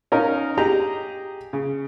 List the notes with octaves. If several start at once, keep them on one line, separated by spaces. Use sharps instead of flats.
C#4 D#4 A#4 F5
G4 G#4 D#5 A#5
C#3